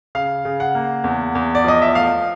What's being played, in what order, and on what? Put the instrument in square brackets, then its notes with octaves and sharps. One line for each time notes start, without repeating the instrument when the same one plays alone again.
[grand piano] C#3 F5
C#3
F#5
A#3
E2
E2
D5
F3 D#5
E5
A3 F5